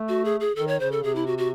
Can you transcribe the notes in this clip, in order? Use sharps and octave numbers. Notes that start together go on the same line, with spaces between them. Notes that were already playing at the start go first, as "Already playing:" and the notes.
Already playing: A3
F#4
G#4
G#4
D#3 A4
C#5
C#3 C5
A4
C3 G#4
E4
F#4
F#4